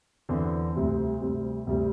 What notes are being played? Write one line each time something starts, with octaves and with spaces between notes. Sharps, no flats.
E2 D3 C4
D2 C3 G3 C4
D2 C3 G3 C4
D2 C3 G3 C4